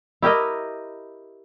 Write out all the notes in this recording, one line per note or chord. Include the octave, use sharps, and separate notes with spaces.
E4 G4 A#4 D#5